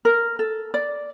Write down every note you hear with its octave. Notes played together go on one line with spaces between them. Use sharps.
A#4
A4
D5